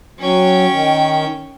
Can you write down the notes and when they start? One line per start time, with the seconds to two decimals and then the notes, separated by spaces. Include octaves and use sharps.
0.19 F#3 C#4 G5
0.70 D#3